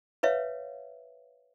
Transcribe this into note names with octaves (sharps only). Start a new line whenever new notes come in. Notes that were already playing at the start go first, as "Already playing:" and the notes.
B4 C#5 E5 F5